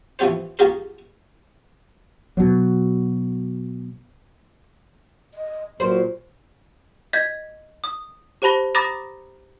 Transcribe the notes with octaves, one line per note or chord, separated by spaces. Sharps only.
E3 F3 C4 C#4 G4 C5
C#4 F4 G4 G#4 A#4
B2 F#3
D#5
A#2 F#3 C5
D#5 G6 G#6 B6
D#6
G4 C5 A5 B5 A#6 G7
A#5 B5 D6 D#6 A6 A#6